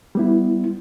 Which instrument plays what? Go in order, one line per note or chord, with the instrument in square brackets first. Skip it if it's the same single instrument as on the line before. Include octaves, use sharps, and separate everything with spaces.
[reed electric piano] G3 B3 E4